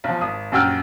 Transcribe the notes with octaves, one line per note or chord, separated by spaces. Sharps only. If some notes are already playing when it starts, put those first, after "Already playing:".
B1 F3
G#1 D#6
A#1 F#2 F#4 G5 E6 F6